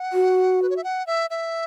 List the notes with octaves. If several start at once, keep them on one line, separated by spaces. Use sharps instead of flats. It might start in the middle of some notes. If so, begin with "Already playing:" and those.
Already playing: F#5
F#4
B4
C#5
E5
F#5
E5
E5